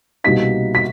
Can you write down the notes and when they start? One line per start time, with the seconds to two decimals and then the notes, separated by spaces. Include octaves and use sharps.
0.24 C2 B2 G3 A#3 D#4 B6
0.75 B6